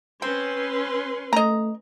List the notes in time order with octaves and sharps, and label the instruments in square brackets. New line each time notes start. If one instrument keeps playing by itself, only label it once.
[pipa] C4 [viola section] C#4 B4 C6
[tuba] A3 [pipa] D#5 A#5